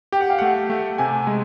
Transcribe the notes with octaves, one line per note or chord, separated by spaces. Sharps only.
G4 G5
F#5
F5
A3 F#5
A3
C3 G#5
G#3